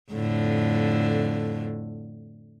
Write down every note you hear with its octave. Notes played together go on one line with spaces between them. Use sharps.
F2 A2 D3